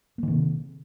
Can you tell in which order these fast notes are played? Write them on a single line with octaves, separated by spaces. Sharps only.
A#3 D#3 C3